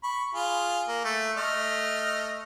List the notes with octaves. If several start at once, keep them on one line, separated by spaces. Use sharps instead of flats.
B5 C#6
F4 G#4
A#3
A3
A3 D#5 F6